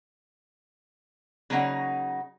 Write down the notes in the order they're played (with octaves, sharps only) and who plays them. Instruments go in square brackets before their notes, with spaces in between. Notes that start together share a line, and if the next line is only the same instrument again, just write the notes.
[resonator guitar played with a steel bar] C#3 F#3 A#3 C#4 D#4 F#5